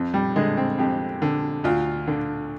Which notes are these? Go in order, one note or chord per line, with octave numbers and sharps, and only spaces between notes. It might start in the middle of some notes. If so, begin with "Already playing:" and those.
Already playing: F2
G3
D3 G#3
C4
F2 G4
D3
D2 F4
D3